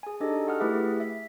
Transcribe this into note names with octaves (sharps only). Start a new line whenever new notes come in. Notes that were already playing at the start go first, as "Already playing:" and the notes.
G#4 G#5
D4 D#4 G4 A4 D#5
F#4 A4 F#5 D#6 F6
A3 E4 G4 G#4 B4 E5
E5